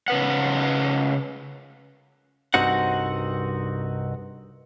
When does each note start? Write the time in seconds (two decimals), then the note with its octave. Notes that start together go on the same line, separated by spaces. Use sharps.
0.08 C#3 B4 F#5
2.54 C2 G2 C4 D#4 F#4 F#5